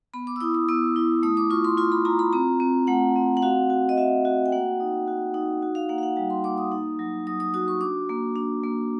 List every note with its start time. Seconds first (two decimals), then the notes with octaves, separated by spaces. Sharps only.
0.14 B3 B5
0.27 D6
0.36 E6
0.41 E4 D#6
0.55 D#6
0.69 B3 E6
0.96 E4
1.23 A3 D#6
1.37 D6
1.50 F4 C#6
1.65 C6
1.77 F4 C6
1.92 B5
2.05 F4 A#5
2.19 B5
2.33 C4 A#5
2.60 C4
2.87 A3 F#5
3.16 C4
3.37 F#5
3.42 F#4 F5
3.70 F#4
3.89 D#5
3.97 F#4 E5
4.25 F#4
4.46 G5
4.52 A#3 F#5
4.80 D#4
5.08 F#4
5.34 D#4
5.62 F#4
5.75 F5
5.89 A#3 F#5
5.98 F5
6.03 F#5
6.16 G3 G5
6.30 C6
6.44 A#3 D6
6.58 D#6
6.72 D#4
6.99 F#3
7.27 F#3 D#6
7.40 D#6
7.54 F#4 D#6
7.68 C#6
7.81 D4 D6
8.09 A#3
8.36 D4
8.64 A#3